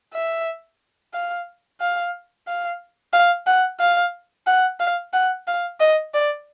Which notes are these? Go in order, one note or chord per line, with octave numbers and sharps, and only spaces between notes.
E5
F5
F5
F5
F5
F#5
F5
F#5
F5
F#5
F5
D#5
D5